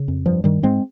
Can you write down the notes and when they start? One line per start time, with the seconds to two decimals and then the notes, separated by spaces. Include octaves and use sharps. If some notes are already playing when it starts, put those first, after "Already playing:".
Already playing: C#3
0.08 F2
0.26 G2 F3
0.44 G2 D#3 G3
0.63 G#2 G#3 C4